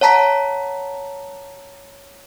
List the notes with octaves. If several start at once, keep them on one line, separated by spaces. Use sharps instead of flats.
C#5 F#5 A5 A#5 B6